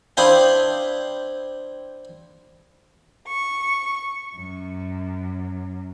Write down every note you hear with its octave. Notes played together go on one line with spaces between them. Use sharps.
C4 D4 E4 F5 G5 D#6
C#6
F#2